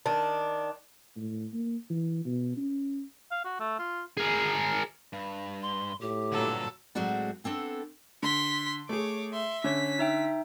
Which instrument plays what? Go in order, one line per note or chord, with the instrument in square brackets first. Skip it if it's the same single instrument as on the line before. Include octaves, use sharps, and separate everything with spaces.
[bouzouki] D#3 D4
[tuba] A2
A#3
E3
B2
C#4
[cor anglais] F5
F#4
A3
F4
[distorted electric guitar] G#4 A#4
[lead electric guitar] G2
[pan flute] C6
[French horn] A2 [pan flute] G4
[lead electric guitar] G2 D3 [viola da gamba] A#2 F#3 A4
[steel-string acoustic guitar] A2 F#3 G#3 C4 F#4 D5
B3 C4 D4 A4
[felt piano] D3 [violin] C6 B6
[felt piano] A3 G#4 [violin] C#5 D6
[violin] E5 C6
[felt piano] D3 [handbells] C#4 C#5 [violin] B6
[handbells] D#4 E5 G5